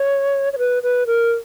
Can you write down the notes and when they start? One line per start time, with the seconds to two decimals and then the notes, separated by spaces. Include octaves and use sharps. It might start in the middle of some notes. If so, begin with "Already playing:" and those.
Already playing: C#5
0.53 C#5
0.58 B4
0.83 B4
1.07 A#4